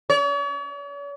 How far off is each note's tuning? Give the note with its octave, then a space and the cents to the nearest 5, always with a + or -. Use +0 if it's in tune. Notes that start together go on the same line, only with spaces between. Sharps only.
C#5 +45